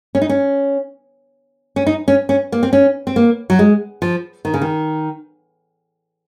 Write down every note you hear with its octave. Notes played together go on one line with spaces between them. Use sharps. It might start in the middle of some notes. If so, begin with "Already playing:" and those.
C#4
D#4
C#4
C#4
D#4
C#4
C#4
A#3
C4
C#4
C4
A#3
F#3
G#3
F3
D#3
C#3
D#3